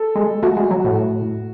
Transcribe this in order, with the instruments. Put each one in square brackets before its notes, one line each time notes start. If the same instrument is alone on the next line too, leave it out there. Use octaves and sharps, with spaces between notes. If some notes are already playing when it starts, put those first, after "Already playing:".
Already playing: [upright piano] A4
[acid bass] G#3
[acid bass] A3 [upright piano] F#4
[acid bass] G#3
F#3
A2